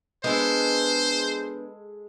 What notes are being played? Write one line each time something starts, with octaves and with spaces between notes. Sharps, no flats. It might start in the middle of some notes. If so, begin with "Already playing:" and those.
G#3 B3 D4 G#4 A4 C5